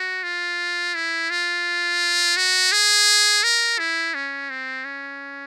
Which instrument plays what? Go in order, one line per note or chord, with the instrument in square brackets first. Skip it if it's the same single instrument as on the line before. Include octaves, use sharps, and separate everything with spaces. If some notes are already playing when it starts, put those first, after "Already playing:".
Already playing: [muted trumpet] F#4
F4
E4
F4
F#4
G#4
A#4
E4
C#4
C4
C#4